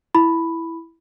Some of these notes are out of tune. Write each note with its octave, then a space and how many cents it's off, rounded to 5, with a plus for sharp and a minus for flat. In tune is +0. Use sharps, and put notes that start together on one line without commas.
E4 +0 B5 +0